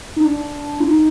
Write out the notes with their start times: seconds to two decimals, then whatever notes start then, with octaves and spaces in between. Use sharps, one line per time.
0.16 D#4
0.25 D4
0.80 F4
0.88 D#4